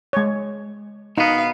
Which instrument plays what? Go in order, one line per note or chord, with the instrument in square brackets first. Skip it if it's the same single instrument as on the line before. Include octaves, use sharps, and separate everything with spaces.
[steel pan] G#3 C#5
[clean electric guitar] B2 B3 [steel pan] D#4 [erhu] F5